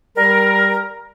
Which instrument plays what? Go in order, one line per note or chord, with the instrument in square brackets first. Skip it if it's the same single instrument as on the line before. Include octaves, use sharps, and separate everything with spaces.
[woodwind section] G3 A#4